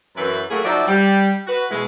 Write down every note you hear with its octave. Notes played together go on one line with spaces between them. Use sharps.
F#2 E3 B4
A2 F#3 A3 A#3 F#4 G#4
F3 F#3 D#4 D5 E5
G3
F#4 B4
B2 E3 G#3